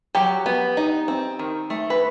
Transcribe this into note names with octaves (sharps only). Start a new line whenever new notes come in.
F#3 G4
B3
D#4
C4
D#3
A3
B4